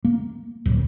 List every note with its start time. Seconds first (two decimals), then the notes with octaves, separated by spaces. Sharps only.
0.04 A#3
0.66 D1